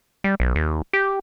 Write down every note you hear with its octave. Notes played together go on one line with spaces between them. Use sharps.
G3
B1
D#2
G4